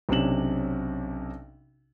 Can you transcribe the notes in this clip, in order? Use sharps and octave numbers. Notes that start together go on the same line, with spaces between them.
B1 C3 C#4 D4 E7 F#7